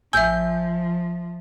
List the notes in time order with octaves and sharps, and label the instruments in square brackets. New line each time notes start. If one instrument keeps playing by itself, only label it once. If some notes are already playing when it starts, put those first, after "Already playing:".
[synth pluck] A1 G#5 [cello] F3 [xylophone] E5 E6 [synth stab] G6